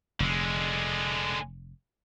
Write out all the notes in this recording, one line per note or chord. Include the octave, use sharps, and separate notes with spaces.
F1 D3 G#3